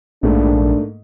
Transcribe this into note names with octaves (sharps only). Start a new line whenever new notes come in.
A#1 G#2 A3 A#3 D4